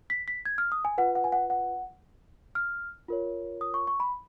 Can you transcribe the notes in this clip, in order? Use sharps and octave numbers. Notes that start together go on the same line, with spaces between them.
B6
B6
G#6
F6
D#6
G#5
F4 B4 F#5
F#5
G#5
F#5
F#5
F6
F4 A#4 C#5
D#6
C#6
C#6
B5